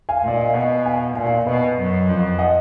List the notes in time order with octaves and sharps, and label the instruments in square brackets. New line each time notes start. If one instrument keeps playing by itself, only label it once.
[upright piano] F5 G#5
[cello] A#2 [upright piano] D5
[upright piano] D#5
F5
[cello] B2 [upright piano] D#5 F#5
[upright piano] F5 G#5
[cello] A#2 [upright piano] F5 G#5
[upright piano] F5 G#5
[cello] B2 [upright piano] B4 D#5
[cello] F#2
F2
[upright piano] D#5 F#5